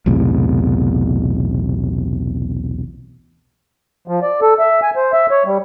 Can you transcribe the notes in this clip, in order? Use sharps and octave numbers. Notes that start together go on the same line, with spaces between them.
B1 E2 A2 C3
F3
D5
A4
E5
G#5
C5
E5
C#5
G3